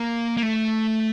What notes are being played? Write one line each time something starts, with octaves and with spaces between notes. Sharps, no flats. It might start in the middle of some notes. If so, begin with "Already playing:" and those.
Already playing: A#3
A#3
A3